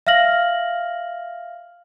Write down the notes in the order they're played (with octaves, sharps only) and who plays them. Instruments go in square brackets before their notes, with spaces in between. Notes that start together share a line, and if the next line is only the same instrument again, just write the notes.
[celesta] E5 F5 F6 A#6 F#7